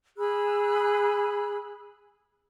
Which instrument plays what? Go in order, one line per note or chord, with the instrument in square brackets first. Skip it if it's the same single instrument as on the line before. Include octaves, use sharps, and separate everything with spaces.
[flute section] G#4 B5 E6 F#6